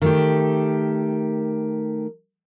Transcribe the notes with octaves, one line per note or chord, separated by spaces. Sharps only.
D#3 A3 G4